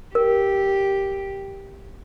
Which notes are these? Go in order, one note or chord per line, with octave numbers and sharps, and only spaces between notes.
G4 A#4